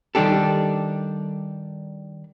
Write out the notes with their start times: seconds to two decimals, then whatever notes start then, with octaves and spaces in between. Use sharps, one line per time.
0.15 D#3 G3 D4 G4 A4